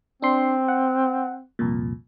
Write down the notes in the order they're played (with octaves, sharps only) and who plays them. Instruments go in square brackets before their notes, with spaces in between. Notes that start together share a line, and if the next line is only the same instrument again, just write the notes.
[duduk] C4 [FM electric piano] D4 C6
[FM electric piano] F#5
C2 F2 A#2